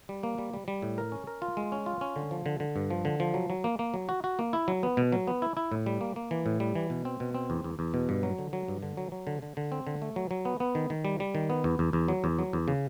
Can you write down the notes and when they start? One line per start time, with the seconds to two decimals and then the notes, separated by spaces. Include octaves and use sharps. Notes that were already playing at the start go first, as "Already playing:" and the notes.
0.09 G3
0.23 A#3
0.38 G3
0.54 G3
0.68 G3
0.82 A2
0.98 A#4
1.12 C#4
1.27 A#4
1.42 F4
1.57 G#3
1.72 C#4
1.86 F4
2.01 C#4
2.16 D3
2.31 F3
2.46 D3
2.60 D3
2.76 G2
2.90 F3
3.05 D3
3.20 F3
3.34 F#3
3.50 F#3
3.64 A#3
3.79 A#3
3.94 F#3
4.09 F#4
4.24 F#4
4.39 A#3
4.53 E4
4.68 F#3
4.83 B3
4.97 B2
5.12 F#3
5.27 B3
5.42 E4
5.57 E4
5.72 A2
5.86 G3
6.01 A#3
6.16 A#3
6.31 E3
6.46 A2
6.60 G3
6.75 E3
6.90 B2
7.05 C4
7.20 B2
7.34 C4
7.50 E2
7.64 E2
7.79 E2
7.94 B2
8.09 G2
8.23 F#3
8.38 D3
8.53 F#3
8.68 G2
8.82 D3
8.97 F#3
9.12 F#3
9.27 D3
9.42 D3
9.57 D3
9.72 C4
9.87 D3
10.02 A3
10.16 F#3
10.31 F#3
10.45 B3
10.60 B3
10.75 D#3
10.90 D#3
11.05 G3
11.20 G3
11.35 D#3
11.50 B3
11.64 E2
11.79 E2
11.93 E2
12.08 F#3
12.24 E2
12.39 F#3
12.53 E2
12.68 C#3